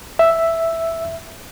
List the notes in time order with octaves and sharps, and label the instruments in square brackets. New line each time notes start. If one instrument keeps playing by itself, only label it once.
[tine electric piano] E5